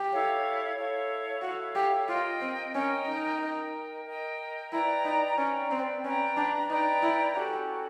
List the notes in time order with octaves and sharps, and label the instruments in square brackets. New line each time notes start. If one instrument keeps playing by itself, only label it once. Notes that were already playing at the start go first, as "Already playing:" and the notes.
Already playing: [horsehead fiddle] G4
[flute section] E4 A4 C#5 F5
E4 A4 C#5 F5
[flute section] E4 A4 C#5 F5 [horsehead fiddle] F#4
[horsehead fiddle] G4
[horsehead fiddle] F4 [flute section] A#4 D#5 G5
[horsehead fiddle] C4
[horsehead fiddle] C#4 [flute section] A#4 D#5 G5
[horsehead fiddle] D#4
[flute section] A#4 D#5 G5
A#4 D#5 G5
[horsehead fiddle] E4 [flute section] B4 D5 G5 A#5
[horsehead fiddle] D#4
[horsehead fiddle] C#4 [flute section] B4 D5 G5 A#5
[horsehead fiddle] C4
[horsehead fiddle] C#4 [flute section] B4 D5 G5 A#5
[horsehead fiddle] D4
[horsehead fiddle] D#4 [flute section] B4 D5 G5 A#5
[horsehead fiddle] E4
[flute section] C#4 F#4 A4 [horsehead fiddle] G4